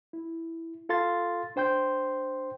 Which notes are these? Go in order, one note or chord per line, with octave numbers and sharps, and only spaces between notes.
E4
F4 A4 F5 C6 A6
D4 C5 G5 C6 G6